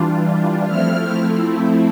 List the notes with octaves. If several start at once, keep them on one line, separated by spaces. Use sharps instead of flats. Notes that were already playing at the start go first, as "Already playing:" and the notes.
Already playing: E3 G3 D4 F4
F3 A3 C4 E4 F6